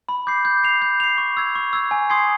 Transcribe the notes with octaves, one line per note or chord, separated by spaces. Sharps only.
B5
D6 G6 C7
G6
C7 F7
G6
C7 F7
C#6
E6 G#6
C#6
E6 G#6
G#5
C6 D#6 G#6 C7